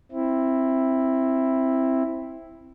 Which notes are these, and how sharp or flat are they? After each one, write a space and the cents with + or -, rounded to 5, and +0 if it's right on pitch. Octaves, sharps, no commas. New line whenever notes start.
C4 +10 E4 +0